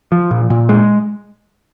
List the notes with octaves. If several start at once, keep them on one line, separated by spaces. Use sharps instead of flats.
F3
A#2
A#2
G#3